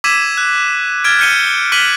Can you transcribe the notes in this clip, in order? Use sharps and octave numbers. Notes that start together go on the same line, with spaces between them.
D6 E6 G#6 B6 D#7 E7
F#6
F6 F#6 G#6 A6 D7
F6 G6 C#7 D#7 G7
D6 F6 F#6 B6 D#7 F#7